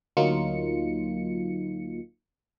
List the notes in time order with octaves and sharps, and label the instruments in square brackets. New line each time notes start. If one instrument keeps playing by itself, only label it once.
[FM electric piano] D2 F#3 A#3 D#4 F4 C#7